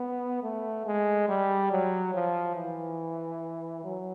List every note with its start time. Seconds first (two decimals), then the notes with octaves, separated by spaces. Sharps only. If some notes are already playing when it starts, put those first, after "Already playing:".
Already playing: B3
0.43 A3
0.86 G#3
1.28 G3
1.71 F#3
2.14 F3
2.56 E3
3.84 F#3